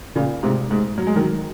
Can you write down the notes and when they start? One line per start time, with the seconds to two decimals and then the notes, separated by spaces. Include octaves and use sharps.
0.15 A#2 C#3
0.43 G#2 C3
0.71 G#2
0.98 F#3
1.07 G#3
1.16 D#3 F#3